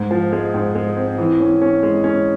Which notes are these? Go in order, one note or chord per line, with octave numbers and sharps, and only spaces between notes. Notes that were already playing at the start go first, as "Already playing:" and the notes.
Already playing: G#2
F3
G#3
G#2
G#3
C4
E3
C#4
C#4
G#3
C#4